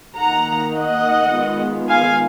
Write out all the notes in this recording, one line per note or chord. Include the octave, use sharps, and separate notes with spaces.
D#3 A#3 D#4 F#5 A#5
D#5 F#5
D#3 G#3 B3 F4
F5 G#5